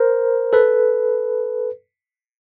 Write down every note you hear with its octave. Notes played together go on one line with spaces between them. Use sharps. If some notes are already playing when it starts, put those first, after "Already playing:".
Already playing: A#4 C5
A4 B4